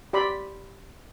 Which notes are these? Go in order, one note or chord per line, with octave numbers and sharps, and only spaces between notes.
G4 D5 B5 C6